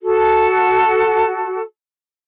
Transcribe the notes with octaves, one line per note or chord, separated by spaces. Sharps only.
F#4 A4